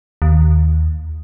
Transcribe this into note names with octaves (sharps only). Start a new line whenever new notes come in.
D#2